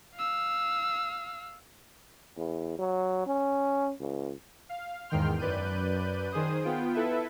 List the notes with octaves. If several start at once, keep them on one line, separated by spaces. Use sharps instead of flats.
F5 E6
E2
F#3
C#4
C#2
F5
E2 G#2 D#3 G5 C6 F6
F#2 B4 D5 F#6 G6 D#7
D#3 G#4 C5 D#6
B3 F4 G5
E4 A4 B4 E5